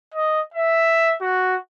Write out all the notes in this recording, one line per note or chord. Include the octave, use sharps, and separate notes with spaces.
D#5
E5
F#4